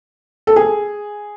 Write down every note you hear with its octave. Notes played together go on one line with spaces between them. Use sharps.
A4
G#4